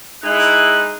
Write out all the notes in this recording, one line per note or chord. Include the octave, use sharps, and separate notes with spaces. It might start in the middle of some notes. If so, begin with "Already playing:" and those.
G#3 D#4 E4 F#6